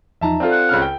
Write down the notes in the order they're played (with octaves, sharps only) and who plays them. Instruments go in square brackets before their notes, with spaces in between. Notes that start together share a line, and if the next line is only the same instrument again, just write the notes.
[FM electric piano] E2 F3 D#4 [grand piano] E5 A5 A#5
[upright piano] C4 F4 [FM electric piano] A4 D5
[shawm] F#5
[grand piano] C#2 C#3 F6
G5